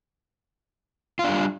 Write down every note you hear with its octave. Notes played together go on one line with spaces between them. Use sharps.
G3 D4 F4